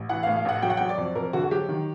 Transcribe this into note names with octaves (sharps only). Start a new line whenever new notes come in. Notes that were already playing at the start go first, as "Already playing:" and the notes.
Already playing: A1
E3 F#5
A2 F5
F5
A1 F#5
F#3 G5
F#5
F#3 G5
D5
F2
F2 A#4
D3 F#4
F#4
F#3 G4
D#3